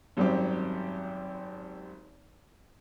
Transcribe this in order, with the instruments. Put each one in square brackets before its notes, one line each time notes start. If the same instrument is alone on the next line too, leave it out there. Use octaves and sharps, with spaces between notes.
[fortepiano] G#1 F#2 G3 C4 G4